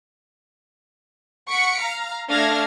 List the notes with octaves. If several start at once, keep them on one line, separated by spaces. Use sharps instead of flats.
F#5 C#6 B6 C#7 D7
F5 A#5
A3 D4 F5 F6 G#6 A#6